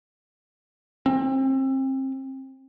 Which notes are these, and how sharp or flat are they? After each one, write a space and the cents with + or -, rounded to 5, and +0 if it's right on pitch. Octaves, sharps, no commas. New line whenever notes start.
C4 +30